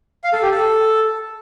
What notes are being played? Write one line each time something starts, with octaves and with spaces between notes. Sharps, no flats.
F5
A4
G4
A4